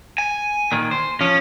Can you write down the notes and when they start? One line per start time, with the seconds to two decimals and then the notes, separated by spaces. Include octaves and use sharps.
0.18 G#5
0.72 A#2 D#3
0.91 C5
1.21 F3 C#4